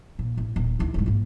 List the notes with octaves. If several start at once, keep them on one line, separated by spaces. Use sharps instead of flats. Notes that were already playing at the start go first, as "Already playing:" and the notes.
A#2
A1
D#1
D2 E4
D1 G#3
G#2 A#3